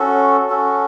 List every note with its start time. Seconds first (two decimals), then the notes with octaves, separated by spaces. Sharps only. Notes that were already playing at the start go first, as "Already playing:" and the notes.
Already playing: C#4 F#4 A4
0.49 C#4 F#4 A4